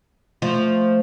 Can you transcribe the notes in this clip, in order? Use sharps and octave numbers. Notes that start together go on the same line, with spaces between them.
F3 A3